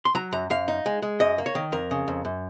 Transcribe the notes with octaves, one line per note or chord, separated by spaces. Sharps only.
C6
F#3 A#5
F#2 A#5
F#2 F5
D#4
G#3
G#3
F#2 D#5
A#3
C#5
D#3
F2 A#4
C#3
F2
F#2